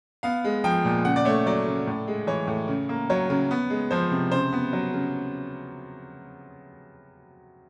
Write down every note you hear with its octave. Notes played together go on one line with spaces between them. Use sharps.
B3 F5
G#3
F3 G5
A#2
C#3 F#5
D5
A3 C#5
F#3 D5
C#3
A2
G#3
E3 C#5
A2
C#3
A#3
F#3 C#5
C#3
B3
G#3
F3 C5
C3
C#3 C5
B3
F#3
C#3